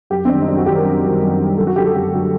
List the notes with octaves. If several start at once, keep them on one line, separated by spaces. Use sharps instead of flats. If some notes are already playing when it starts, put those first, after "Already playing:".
F#2 G4
C4
D#3 G3 D4
D#4
F#2 D4
F#4
D#3 G3 G4
A#4
F#2
D#3 G3
F#2
D#3 G3
F#2 A4
F#4
D3 F#3 A3 G4
A4
F#2 G4
D3 F#3 A3